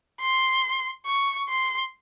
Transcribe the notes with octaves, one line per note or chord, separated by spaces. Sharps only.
C6
C#6
C6